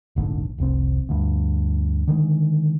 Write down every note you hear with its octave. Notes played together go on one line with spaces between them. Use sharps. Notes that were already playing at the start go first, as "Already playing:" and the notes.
F1 A#1 G#2 D3
F1 C2 C4
D2 G2
D3 D#3 G3 G#3